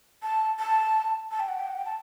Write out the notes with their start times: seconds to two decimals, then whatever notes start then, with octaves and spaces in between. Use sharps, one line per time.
0.23 A5
0.59 A5
1.31 A5
1.40 G5
1.49 F#5
1.57 G5
1.68 F#5
1.76 G5
1.86 A5